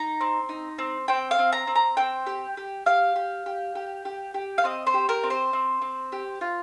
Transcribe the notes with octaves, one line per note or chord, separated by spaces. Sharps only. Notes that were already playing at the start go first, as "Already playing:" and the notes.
Already playing: D#4 A#5
C4
D#4
C4
C4 G5
F5
C4
A#5
C4
A#5
C4 G5
G4
G4
G4 F5
G4
G4
G4
G4
G4
F5
C4 D#5
C5
G4
A#4
C4
C5
C4
C4
G4
F4